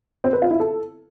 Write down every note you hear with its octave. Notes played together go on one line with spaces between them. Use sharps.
C4
B4
F4
E4
A4